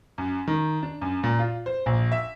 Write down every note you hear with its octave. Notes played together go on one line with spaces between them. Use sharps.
F#2
D#3
D4
F#2
A#2
F4
C5
A#1
E5